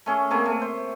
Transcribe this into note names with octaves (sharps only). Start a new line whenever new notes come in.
A3 C#4 G#4
C3 A3 A#3 G#4
A3
C5